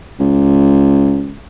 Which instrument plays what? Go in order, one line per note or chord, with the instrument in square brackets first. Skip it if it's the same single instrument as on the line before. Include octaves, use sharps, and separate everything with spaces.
[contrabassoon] C#2